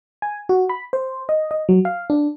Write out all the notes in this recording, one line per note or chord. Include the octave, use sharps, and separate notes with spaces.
G#5
F#4
B5
C5
D#5
D#5
F#3
F5
D4